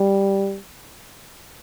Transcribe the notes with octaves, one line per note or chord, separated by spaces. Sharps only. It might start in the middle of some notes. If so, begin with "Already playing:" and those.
Already playing: G3